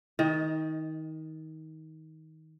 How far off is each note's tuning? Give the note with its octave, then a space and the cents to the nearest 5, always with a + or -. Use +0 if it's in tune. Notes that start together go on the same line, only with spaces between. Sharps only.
D#3 +25 D#5 +0